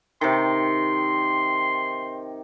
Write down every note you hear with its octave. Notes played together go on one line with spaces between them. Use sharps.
C3 D#3 C6